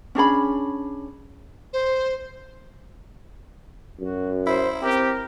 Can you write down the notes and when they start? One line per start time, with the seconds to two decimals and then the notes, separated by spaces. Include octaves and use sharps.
0.15 C#4 D4 G#4 B5
1.73 C5
4.00 F#2 F#4
4.47 E4 C5
4.82 C4 G4 A#4